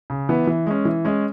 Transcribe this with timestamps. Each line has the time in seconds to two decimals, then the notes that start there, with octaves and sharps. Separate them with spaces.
0.10 C#3
0.29 E3 B3
0.47 E3
0.67 G#3 C#4
0.85 E3
1.05 G#3 C#4